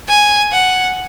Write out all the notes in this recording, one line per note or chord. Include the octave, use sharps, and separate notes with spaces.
G#5
F#5